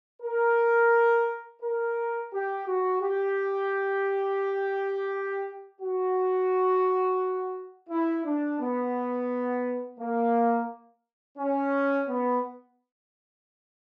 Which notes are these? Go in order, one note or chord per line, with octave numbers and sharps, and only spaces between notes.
A#4
A#4
G4
F#4
G4
F#4
E4
D4
B3
A#3
C#4
B3